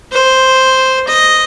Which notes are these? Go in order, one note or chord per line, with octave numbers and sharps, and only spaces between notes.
C5
D#5